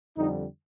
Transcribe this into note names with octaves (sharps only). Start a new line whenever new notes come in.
F2 D3 G3 D#4